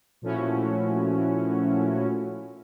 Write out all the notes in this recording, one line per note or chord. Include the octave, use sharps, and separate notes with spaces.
A#2 F3 A3 C#4 E4 F#4